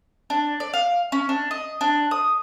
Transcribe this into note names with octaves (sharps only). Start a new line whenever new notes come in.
D4
D5
F5
C#4
D4
D#5
D4
D#6